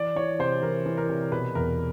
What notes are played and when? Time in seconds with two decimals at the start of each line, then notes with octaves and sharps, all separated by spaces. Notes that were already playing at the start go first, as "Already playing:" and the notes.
Already playing: E3 D5
0.16 E3 C#5
0.39 C3 C5
0.62 E3 A#4
0.86 E3
0.97 A#4
1.09 C3
1.32 B2 B4
1.55 E2 A#4